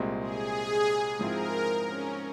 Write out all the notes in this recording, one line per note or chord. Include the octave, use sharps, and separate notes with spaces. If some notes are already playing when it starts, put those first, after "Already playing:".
Already playing: C2 A#2 G#3 C4
G#4
G#2 F3 C4 E4 A#4
C#4